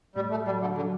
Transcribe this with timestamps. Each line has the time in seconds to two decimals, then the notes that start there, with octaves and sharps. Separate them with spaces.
0.15 A2 G3
0.31 A3
0.45 F#3 G3
0.61 D3
0.76 D3 F#3